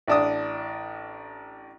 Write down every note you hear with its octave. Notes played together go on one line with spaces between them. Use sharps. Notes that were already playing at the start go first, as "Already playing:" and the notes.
A1 D4 D#6